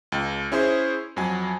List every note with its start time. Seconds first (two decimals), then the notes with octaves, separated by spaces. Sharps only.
0.12 C#2
0.52 C#4 E4 G#4 C5
1.16 F2 F#3 G#5